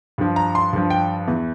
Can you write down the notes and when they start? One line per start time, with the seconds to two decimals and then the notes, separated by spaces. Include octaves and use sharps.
0.18 G2 F3
0.36 A#5
0.55 C6
0.73 G2 F3
0.90 G5
1.27 E2 E3